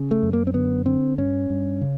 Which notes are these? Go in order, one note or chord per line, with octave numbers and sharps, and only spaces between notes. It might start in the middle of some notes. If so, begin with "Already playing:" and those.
Already playing: C#3
A3
F#2
A#3
C4
D3 B3
D3 C4
G2 C#4
G2
C#3